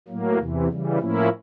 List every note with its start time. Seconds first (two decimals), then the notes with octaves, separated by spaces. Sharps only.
0.08 A2 F#3 A#3
0.38 E2 C3 E3
0.68 C#3 E3 G3
0.99 A2 F3 A#3 C#4 E4